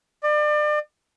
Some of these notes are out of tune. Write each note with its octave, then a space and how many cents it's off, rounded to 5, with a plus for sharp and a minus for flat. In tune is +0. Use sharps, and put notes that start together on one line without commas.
D5 +35